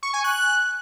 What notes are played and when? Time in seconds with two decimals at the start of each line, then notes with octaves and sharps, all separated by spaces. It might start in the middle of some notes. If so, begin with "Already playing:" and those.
0.03 C#6
0.13 G#5
0.24 F#6